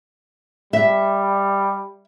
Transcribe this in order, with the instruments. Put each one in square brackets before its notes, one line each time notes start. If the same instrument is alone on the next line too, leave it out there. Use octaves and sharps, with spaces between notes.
[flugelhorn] G3 [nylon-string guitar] E5